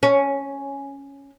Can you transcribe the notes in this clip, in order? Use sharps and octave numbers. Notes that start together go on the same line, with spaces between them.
C#4